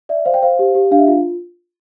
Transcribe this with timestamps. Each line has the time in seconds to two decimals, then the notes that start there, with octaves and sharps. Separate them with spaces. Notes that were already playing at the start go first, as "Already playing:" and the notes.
0.09 D5 E5
0.25 C5 F5
0.34 G5
0.42 C5 F5
0.59 G4
0.75 G4
0.91 D4 F5
0.99 E5
1.07 F4 F5